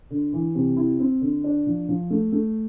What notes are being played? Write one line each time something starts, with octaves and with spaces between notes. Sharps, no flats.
D3
E3
C3
E4
C4
D3
D4
F3
F3
A3
A3